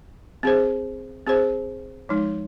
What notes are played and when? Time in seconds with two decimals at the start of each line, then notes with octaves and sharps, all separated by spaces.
0.43 C4 G#4 C5
1.27 C4 G#4 C5
2.09 F3 G#3 D#4